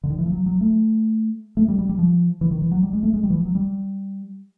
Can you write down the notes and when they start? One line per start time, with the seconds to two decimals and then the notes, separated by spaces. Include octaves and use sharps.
0.04 D3
0.10 D#3
0.18 E3
0.26 F3
0.32 F#3
0.46 F#3
0.61 A3
1.57 A3
1.68 G3
1.79 G3
1.89 G3
1.99 F3
2.41 E3
2.51 D#3
2.62 E3
2.71 F#3
2.83 G3
2.93 G#3
3.03 A3
3.14 G#3
3.23 G3
3.30 E3
3.35 F3
3.45 F#3
3.55 G3